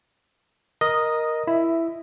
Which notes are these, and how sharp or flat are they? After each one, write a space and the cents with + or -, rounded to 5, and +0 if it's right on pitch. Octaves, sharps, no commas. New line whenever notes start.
A#4 +10 D#5 +0 D#6 -10
E4 +10 E5 +0